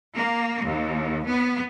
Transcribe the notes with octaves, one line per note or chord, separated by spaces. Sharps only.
A#3
D#2
B3